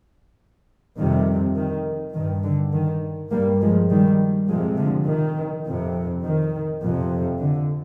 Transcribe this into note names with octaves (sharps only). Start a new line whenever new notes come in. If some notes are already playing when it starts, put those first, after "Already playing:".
F2 C3 D#3 G3
D#3
G2 D#3
D3
D#3
G2 G3 A#3
F3 G#3
D#3 G3
F2 C3 F3 G#3
D3 F3
D#3
F2 C3
D#3
F2 C3
D3